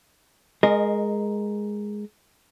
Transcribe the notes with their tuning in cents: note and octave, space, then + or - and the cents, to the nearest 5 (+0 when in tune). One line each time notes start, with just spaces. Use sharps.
G#3 +0 A#4 +0 D#5 -25